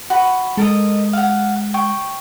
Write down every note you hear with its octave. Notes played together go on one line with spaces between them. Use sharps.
F#4 B5
G#3 A4 A#4 D#5
F5 F#5
G5 C#6